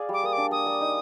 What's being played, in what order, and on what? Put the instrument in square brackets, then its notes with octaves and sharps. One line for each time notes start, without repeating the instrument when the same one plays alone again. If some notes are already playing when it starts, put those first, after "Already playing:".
Already playing: [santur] G#4 D5 F5
[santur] G3 [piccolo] D6
[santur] A#3 [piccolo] D#6
[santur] D4 [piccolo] D6
[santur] A#3 [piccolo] D#6
[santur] A#3
D#4